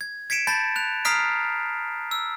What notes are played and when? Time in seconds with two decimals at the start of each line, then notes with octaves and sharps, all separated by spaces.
0.01 G#6
0.30 G#6 B6 C#7 D7 E7
0.47 A5 B5 G6 A6
0.76 F#6 F7
1.05 A#5 D#6 F6 B6 C7 D7
2.11 E6